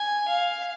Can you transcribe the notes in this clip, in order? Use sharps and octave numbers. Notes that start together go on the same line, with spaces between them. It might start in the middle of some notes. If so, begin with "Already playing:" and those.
Already playing: G#5
F5